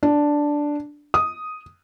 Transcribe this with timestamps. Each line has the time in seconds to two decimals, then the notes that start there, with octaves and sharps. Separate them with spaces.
0.03 D4
1.14 D#6